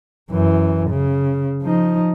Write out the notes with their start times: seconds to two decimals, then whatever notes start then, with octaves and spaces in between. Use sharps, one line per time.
0.31 F#2 E3
0.90 C#3
1.63 F3 D#4